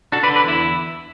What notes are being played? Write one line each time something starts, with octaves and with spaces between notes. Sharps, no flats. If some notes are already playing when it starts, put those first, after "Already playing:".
D4 F#4 A4
B4 D5
D3
B4 D5
E2 E4